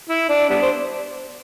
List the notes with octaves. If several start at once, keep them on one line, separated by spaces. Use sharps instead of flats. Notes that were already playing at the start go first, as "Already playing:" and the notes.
E4
D4
G3 B3 D4
C5